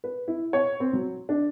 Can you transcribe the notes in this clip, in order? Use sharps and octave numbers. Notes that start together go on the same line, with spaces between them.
B4
E4
C#5
C4
F#3
D4